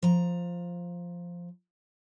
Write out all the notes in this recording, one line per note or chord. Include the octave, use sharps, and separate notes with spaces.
F3 A#5